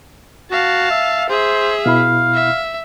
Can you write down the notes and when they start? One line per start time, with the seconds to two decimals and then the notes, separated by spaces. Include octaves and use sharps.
0.51 F#4 F5 A5
0.91 E5
1.29 G#4 C5 E5
1.86 B2 E4 F5 B5
2.34 E5